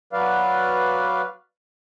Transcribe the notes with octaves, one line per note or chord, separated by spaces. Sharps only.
F#3 B4 D5 F5